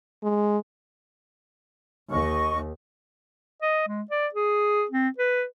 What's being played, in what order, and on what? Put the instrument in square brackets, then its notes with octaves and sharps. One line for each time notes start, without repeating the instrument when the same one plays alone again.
[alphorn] G#3
[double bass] D#2 [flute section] D#5 C#6
[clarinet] D#5
G#3
D5
G#4
C4
B4